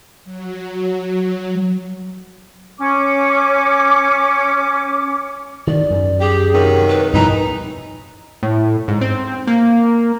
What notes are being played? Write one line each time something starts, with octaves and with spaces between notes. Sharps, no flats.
F#3
C#4 D6
D#3 D5
F#2
G4 G#4
C3 D#3 F#3
B4
G2 B2 E3 F3 D#4 A#5
A2
G#2
C4
A#3